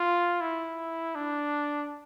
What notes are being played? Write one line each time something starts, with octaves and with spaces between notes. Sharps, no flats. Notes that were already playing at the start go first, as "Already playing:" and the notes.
Already playing: F4
E4
D4